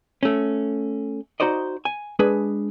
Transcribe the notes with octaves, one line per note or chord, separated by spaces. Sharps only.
A3 C#4
D#4 F#4 C5 D5 D#5
G#5
G#3 D4 G#4 B4